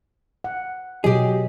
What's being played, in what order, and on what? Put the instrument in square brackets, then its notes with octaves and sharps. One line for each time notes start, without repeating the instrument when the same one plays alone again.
[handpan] F#5
[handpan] B2 F#3 D#5 [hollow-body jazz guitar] G4 G#4